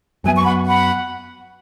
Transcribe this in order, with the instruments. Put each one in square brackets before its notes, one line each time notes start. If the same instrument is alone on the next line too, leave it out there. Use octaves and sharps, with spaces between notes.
[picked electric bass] F#2 F#3 B3 [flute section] E5 G#5
[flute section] C#6
F#5 B5
F#5 B5